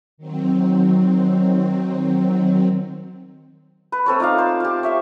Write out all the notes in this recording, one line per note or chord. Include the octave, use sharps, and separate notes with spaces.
D#3 F#3 C4
B4
A3 C4 A4 C#5
D#4 F4 D5 F5
C5
F4 G4
C#5 E5 G5